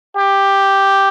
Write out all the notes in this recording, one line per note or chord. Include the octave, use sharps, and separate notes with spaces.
G4